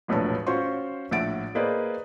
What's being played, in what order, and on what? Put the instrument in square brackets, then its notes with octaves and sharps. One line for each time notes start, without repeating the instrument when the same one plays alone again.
[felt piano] E1 A#1 A2 B4 C#5 A5
C#4 F4 F#4 C5 C6 C#6
A#1 A2 E5 F#5 A6 D7
A#3 G#4 B4 C5 D5 D#5